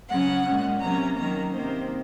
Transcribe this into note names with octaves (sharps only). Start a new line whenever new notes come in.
C#3 F#3 C#4 F#5
A#2 G#3 C#4
C3 F#3 A#3 C#4 A#5
D#3 F#3 A#3 C#4 A#5
C3 D#3 A#3 C5